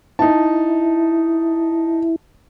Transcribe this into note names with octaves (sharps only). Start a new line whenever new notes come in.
D#4 E4 A5